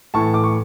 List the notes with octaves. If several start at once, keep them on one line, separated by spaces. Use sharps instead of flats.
A2 E3 A5 C#6
D6
C#6